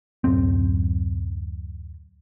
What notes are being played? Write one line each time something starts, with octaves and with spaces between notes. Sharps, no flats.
D1 F#2 C4